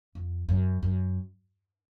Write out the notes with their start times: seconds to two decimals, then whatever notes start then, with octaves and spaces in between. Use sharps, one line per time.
0.15 F2
0.49 F#2
0.83 F#2